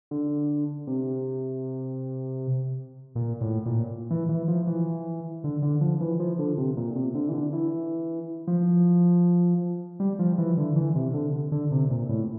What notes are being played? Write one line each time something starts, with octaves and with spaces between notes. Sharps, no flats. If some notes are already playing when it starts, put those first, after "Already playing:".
D3
C3
A#2
A2
A#2
E3
E3
F3
E3
D3
D3
F3
E3
F3
D3
C3
A#2
C3
D3
E3
D3
E3
F3
G3
F3
E3
D3
E3
C3
D3
D3
C3
A#2
A2